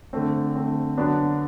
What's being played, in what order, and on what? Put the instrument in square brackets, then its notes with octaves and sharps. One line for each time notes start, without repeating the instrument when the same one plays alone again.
[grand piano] D3 A3 C4
D3 A3 C4
D3 F#3 B3 D4